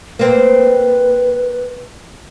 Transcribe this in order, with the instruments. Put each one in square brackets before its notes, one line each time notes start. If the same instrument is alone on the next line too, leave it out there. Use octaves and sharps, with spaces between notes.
[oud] A#3 C4 [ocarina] B4